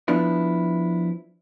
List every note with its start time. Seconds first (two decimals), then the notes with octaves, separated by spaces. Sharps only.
0.08 F3 B3 D4 E4